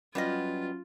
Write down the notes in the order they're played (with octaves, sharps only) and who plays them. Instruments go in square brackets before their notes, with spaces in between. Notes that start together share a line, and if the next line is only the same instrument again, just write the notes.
[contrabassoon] F#2 [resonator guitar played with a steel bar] G3 B3 D#5 [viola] F4